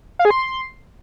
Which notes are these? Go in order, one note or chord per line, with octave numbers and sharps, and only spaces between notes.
F5
G#4
C6